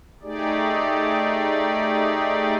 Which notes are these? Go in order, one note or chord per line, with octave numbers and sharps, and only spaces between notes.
A3 D#4 G4 G#4 D5